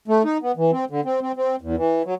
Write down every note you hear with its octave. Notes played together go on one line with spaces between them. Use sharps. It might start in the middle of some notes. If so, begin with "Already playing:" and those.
A3
D#4
B3
E3
C4
D3
C4
C4
C4
E2
E3
F#3